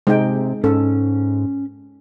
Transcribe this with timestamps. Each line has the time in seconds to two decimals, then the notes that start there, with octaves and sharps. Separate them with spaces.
0.07 C3 G#3 D#4 G5
0.64 G#2 C#4 A4